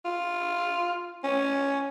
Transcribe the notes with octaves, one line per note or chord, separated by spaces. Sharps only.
F4
C#4